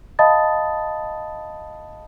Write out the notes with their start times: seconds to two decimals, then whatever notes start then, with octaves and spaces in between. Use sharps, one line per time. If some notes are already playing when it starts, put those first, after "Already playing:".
0.19 D#5 F5 A5 B5 D#6 A6